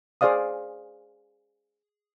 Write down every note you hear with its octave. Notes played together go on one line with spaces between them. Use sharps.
G#4 C5 D5 F5 D#6